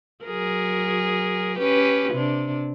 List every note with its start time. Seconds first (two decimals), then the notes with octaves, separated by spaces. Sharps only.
0.25 F#3 G#4 A#4
1.58 C#4 G4 B4
2.13 C3 D4